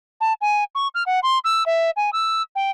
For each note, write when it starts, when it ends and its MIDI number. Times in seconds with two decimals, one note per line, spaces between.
0.21 0.33 81
0.41 0.64 80
0.75 0.88 85
0.95 1.03 89
1.06 1.19 78
1.23 1.39 84
1.44 1.63 88
1.66 1.91 76
1.96 2.10 80
2.13 2.42 88
2.55 2.71 79